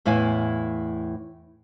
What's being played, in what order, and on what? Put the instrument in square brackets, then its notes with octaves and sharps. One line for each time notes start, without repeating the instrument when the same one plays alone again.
[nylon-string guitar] E2 A2 E4 F5 G#5